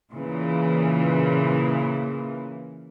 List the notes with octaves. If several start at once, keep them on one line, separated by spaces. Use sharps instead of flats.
A#2 C#3 E3